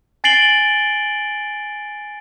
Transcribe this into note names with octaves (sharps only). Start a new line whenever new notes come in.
G#5 A6 C7 D7 F#7 G7